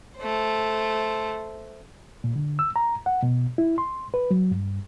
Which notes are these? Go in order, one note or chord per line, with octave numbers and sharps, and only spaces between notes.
A3 C5
A#2
D3
E6
A#5
F#5
B2
E4
C6
B4
F#3
G2